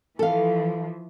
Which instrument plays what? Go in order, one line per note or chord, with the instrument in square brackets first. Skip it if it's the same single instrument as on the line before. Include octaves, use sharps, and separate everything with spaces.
[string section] E3 F3 [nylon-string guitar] A4 F5